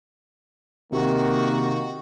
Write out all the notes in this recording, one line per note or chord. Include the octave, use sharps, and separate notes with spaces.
C3 D#3 A#3 F#4